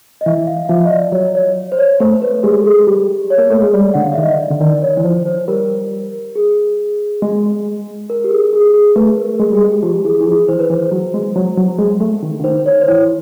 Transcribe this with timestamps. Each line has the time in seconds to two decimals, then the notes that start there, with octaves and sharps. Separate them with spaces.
0.21 D#5
0.26 E3 E5
0.47 F5
0.65 F5
0.69 F3 E5
0.85 D#5
0.90 D5
1.12 F#3 C#5
1.35 C#5
1.72 C5
1.79 C#5
2.00 A3 C5
2.22 B4
2.43 G#3 G4
2.60 A4
2.64 G#4
2.87 G3 G4
3.30 C#5
3.38 A#3
3.50 A3
3.62 G#3
3.73 G3 D5
3.94 D3 F#5
4.03 F5
4.13 E5
4.18 D#3
4.23 D#5
4.32 D5
4.50 D3
4.60 D#3 D5
4.82 C#5
4.97 E3
5.04 F3 C5
5.26 C5
5.48 G3 A#4
6.35 G#4
7.22 G#3
8.10 A#4
8.24 G4
8.31 G#4
8.53 G#4
8.74 G#4
8.96 A3 B4
9.17 A#4
9.39 G#3 G#4
9.52 G3 G#4
9.61 G#3 G4
9.83 F3 G4
10.05 E3 G#4
10.21 E3
10.26 F3 G#4
10.48 E3 C5
10.59 B4
10.70 E3 C5
10.91 F#3
11.14 G#3
11.36 F#3
11.57 F#3
11.79 G#3
12.00 A3
12.22 D#3
12.40 D3
12.44 D#3 C5
12.66 C#5
12.81 C5
12.87 E3 C#5